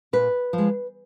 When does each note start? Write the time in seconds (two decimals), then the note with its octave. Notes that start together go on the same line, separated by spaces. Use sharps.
0.13 A#2 B4
0.53 F3
0.58 G#3